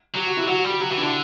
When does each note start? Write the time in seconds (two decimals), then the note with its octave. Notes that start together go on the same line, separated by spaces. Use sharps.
0.15 F#3 G4
0.26 F#4
0.37 E4
0.43 G4
0.47 F#3 F#4
0.59 F#4
0.64 G3
0.69 G4
0.80 F#3 G4
0.91 E3 F#4
0.97 D4
1.02 D3 E4